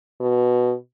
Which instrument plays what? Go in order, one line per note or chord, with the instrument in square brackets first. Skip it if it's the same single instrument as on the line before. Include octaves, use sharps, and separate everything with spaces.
[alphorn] B2